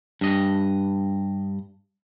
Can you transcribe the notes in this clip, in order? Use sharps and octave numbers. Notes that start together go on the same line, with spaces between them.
G2 D#5